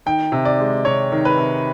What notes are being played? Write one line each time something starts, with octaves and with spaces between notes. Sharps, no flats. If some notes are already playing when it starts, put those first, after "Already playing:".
D#3 G5
C3
D5
G#3
C3 C#5
D#3
B4
C3